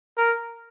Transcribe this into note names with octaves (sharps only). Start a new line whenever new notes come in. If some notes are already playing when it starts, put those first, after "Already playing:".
A#4